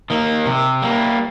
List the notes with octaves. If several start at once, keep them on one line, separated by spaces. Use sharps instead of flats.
D#3 A#3
C3
G3 A#3